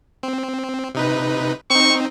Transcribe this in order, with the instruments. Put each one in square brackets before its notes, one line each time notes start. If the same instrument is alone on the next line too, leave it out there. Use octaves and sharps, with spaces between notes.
[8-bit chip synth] C4
C3 D#4 B4
[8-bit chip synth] C4 D#4 [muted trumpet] C#6